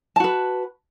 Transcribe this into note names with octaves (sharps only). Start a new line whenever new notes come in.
F#4 B4 A5